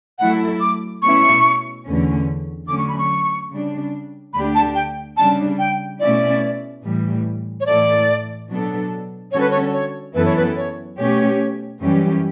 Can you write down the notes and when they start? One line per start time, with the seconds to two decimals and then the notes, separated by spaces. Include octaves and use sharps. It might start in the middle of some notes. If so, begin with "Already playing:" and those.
0.19 F#3 A3 E4 A4 F#5
0.60 D6
1.02 B2 A3 C#4 E4 C#6
1.85 E2 D3 A3 C#4
2.67 D3 F#3 A3 C#4 D6
2.78 C#6
2.88 B5
2.98 C#6
3.50 C#3 G3 D4
4.33 D2 D3 A3 D4 G4 B5
4.55 A5
4.75 G5
5.17 C#3 G3 D4 A5
5.59 G5
6.00 B2 A3 C#4 E4 D5
6.83 A2 E3 G3
7.60 C#5
7.66 A2 E3 A3 E4 A4 D5
8.48 B2 F#3 B3 D4 A4
9.32 D3 G3 C#4 F#4 A4 C#5
9.40 B4
9.51 C#5
9.73 C#5
10.14 F#2 E3 B3 E4 A4 B4
10.25 C#5
10.36 B4
10.56 C#5
10.97 B2 A3 C#4 G4 C#5
11.80 F#2 E3 G3 C#4 G4